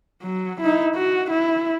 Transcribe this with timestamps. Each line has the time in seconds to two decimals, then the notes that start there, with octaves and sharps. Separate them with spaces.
0.22 F#3
0.60 D#4 E4
0.95 F#4
1.31 E4